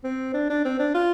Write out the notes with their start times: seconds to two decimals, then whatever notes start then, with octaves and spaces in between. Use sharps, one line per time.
0.04 C4
0.34 D4
0.50 D4
0.65 C4
0.79 D4
0.95 F4